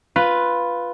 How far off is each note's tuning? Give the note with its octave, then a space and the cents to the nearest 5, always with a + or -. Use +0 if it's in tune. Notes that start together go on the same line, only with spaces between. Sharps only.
F4 +0 B4 +0